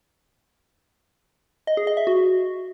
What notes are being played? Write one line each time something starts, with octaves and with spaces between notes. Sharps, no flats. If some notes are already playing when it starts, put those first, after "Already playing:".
D#5
G#4
D#5
E5
F#4